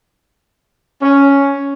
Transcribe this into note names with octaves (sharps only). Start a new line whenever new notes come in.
C#4